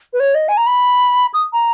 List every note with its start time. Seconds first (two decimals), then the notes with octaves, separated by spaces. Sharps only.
0.13 B4
0.20 C#5
0.35 D#5
0.48 G#5
0.57 A#5
0.67 B5
1.34 D#6
1.53 A#5